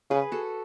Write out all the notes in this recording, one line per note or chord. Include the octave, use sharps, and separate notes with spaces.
C#3 G#4 B4
F#4 A4